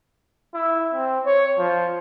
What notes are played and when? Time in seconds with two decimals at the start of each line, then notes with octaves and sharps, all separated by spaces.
0.54 E4
0.94 C4
1.26 C#5
1.58 F3